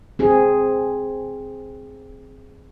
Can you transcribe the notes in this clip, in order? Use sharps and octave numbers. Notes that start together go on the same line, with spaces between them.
C4 G#4